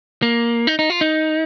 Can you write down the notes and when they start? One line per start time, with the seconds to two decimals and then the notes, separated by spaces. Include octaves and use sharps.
0.22 A#3
0.67 D#4
0.79 D#4
0.90 F4
1.01 D#4